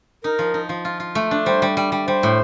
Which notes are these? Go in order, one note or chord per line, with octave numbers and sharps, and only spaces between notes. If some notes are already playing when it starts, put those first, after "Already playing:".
D#4 A#4
F3
D#4
F3
F4
F4
A3
D4
G3 C5
G3
G3
G3
G3 C5
A2